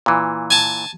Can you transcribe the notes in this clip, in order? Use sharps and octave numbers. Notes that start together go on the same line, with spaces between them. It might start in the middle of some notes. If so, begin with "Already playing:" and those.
A#2 E3
G#5 A5